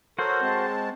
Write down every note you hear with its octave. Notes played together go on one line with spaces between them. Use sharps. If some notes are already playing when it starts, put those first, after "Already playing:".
F#4 A4 A#4 C5 C#5
G#3 C4 A5